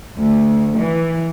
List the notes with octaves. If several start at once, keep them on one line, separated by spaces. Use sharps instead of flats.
D2
E3